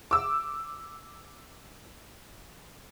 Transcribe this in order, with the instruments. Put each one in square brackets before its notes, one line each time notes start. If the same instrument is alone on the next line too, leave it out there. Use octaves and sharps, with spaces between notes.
[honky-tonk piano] D6 E6